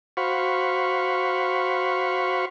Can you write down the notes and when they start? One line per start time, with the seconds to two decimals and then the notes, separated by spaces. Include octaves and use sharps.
0.17 F#4 C5 F5 B5 C#6